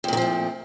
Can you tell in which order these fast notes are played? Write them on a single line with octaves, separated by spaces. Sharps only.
F2 A#2 D#3 F3 A3